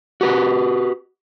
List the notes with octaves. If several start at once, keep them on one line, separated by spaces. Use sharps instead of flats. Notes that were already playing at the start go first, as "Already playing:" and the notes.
F#4 G4 B4